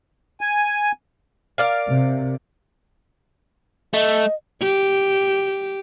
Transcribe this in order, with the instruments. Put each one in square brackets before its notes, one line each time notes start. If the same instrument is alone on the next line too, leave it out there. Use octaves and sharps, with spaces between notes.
[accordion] G#5
[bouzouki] A#4 D5 F5
[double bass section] C3
[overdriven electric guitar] A3 [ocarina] D#5
[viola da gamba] G4